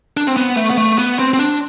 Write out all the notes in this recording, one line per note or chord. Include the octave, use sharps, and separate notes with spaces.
D4
C4
B3
A3
B3
A3
B3
C4
C4
D4